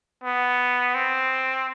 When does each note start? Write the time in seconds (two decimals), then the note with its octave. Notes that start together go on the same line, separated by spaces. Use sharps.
0.24 B3
0.95 C4